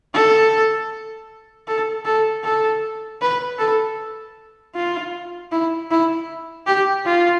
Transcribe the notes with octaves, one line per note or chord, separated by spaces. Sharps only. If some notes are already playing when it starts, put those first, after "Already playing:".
A4
A4
A4
A4
B4
A4
F4
E4
E4
G4
F4